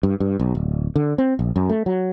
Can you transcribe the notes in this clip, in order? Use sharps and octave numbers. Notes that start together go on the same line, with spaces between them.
G2
G2
B1
D1
D3
C4
A#1
F#2
A3
F#3